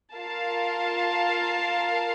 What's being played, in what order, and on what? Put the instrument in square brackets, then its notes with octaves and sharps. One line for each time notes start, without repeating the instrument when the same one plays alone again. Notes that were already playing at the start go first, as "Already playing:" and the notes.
[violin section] F4 A#4 F5 A5